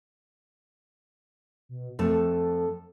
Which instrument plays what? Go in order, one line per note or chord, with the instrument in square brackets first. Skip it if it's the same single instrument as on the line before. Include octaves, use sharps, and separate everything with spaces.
[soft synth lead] B2
[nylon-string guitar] F2 A3 A5 [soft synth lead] A4